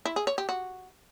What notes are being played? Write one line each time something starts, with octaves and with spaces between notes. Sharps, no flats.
E4
G#4
C#5
G4
F#4